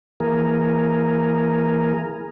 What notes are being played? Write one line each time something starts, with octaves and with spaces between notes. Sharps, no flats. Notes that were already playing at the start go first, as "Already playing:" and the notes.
E3 A#3 G#4 A#4